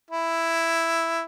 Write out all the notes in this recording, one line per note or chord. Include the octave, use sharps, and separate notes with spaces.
E4